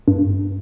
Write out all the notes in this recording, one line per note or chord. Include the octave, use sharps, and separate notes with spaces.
G2